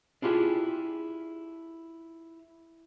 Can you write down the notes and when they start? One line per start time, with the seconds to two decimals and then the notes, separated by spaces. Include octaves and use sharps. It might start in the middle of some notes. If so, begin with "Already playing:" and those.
0.22 D4 E4 F4 G4 G#4